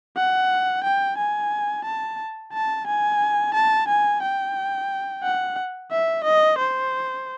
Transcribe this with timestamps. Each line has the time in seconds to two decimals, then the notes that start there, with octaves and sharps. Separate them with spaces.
0.17 F#5
0.84 G5
1.18 G#5
1.85 A5
2.53 A5
2.87 G#5
3.54 A5
3.88 G#5
4.22 G5
5.23 F#5
5.92 E5
6.24 D#5
6.59 C5